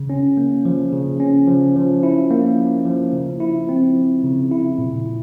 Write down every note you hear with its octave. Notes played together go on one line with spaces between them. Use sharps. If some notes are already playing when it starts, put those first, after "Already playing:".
Already playing: C#3
C#4
A#3
F3
C#3
C#4
F3
F3
E4
A#3
F3
F3
C#3
E4
C4
F3
C#3
E4
A#2
A#2